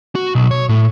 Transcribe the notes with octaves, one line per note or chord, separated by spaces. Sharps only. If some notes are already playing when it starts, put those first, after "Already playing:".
F#4
B1
C#5
A2